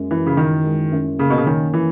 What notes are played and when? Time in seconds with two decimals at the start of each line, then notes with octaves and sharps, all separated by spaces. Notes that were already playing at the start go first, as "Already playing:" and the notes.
Already playing: F#2 G#3
0.11 F#2 E3
0.26 C#3
0.37 D#3 E3
0.65 G#3
0.92 F#2
1.19 C#3 A#3
1.30 B2
1.38 C#3
1.46 D#3 C#4
1.74 E3